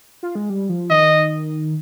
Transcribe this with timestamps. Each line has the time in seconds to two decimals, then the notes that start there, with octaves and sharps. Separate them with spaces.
0.23 F4
0.35 G#3
0.50 G3
0.69 F3
0.90 D#3 D#5